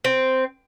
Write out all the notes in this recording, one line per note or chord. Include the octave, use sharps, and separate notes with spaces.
C4